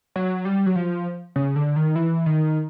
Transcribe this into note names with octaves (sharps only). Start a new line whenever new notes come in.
F#3
G3
F#3
F3
C#3
D3
D#3
E3
D#3